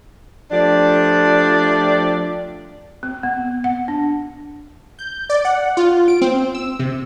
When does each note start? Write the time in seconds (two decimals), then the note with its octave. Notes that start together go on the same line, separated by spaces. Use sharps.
0.51 F3 A3 D4 G4 D5
3.03 C4
3.23 B3
3.64 F#5
3.88 D4
4.99 G6
5.30 D5
5.45 F#5
5.77 F4
6.08 D7
6.22 C4
6.55 E6
6.79 C3